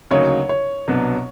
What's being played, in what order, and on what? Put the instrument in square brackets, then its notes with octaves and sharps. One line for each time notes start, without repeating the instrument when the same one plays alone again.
[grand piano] D2 C#3 F#3 A#3 D#4 [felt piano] C#5
[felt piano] C#5
[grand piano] C2 B2 F#3 B3 D4